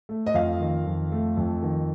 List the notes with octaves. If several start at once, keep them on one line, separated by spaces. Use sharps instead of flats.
A3
D#5
F2 F5
D#3
F2
A3
F2
D#3